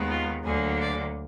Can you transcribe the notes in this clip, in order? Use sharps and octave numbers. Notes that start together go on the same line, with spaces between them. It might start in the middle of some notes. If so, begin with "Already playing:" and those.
Already playing: D#2 D#3 G#3 B3
F4
D2 D3 F#3 A#3 G#4
D5